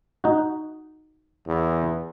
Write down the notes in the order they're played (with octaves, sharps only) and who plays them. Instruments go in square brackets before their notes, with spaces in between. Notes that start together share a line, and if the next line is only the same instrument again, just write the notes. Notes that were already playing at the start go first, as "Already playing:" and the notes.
[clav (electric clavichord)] D#4 F#4
[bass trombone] E2